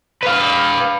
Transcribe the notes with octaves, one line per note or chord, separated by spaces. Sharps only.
B4 F5